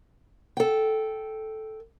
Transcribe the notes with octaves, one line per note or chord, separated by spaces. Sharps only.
A4 G5